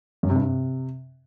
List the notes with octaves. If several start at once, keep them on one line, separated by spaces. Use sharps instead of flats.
F#2
C3
G2
C3